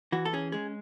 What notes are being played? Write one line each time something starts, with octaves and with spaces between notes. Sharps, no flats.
E3 F#4
A4
C#4 G#4
G#3 G#4